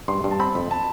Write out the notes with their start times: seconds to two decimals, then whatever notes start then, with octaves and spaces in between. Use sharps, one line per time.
0.08 G2 C6
0.24 G2
0.31 A5
0.40 C4 B5
0.55 F2
0.71 A5